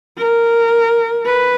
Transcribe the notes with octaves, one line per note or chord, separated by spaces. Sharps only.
A#4
B4